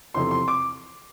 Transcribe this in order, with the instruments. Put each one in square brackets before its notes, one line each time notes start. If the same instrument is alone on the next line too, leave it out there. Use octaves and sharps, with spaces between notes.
[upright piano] E2 C3 F3 A3 C6
C6
D6